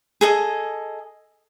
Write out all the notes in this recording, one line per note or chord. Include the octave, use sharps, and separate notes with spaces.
G#4 A4 D#5